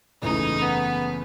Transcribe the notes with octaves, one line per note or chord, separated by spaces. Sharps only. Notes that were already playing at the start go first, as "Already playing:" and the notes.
F#1 E2 C#3 E3 A3 D#4
B3